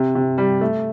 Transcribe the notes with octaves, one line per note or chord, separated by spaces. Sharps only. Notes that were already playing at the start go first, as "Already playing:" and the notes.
Already playing: C3
C3
G3
A3